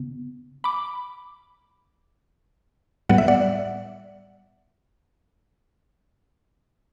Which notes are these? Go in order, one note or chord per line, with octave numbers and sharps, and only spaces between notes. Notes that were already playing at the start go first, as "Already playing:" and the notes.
Already playing: C#3 B3
B5 D6
A2 G3 B3 F#5
E5
D5 F#5